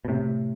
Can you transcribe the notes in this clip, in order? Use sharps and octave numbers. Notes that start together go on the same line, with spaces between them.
B2
A2 C3